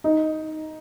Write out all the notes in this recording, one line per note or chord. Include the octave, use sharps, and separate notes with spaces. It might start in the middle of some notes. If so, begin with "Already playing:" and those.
D#4